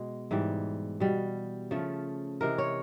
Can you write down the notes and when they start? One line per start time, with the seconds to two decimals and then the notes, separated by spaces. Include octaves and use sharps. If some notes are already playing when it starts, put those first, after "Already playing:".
Already playing: B2 G#3
0.31 G#2 E3 G3
1.00 B2 G3
1.71 C#3 F3 A3
2.41 C3 E3 G#3 A#4
2.58 C#5